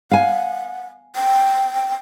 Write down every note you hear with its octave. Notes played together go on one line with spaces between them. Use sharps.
F5 F#5 G#5
G5